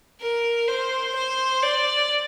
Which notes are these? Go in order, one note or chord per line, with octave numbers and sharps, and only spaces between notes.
A#4
C5
C5
D5